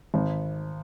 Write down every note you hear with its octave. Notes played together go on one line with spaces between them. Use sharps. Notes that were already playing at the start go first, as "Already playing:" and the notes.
G#1